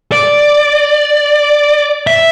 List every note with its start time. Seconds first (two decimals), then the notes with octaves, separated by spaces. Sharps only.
0.12 D5
2.07 E5